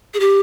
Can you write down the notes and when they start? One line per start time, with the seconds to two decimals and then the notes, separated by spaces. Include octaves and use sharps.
0.14 G#4
0.20 G4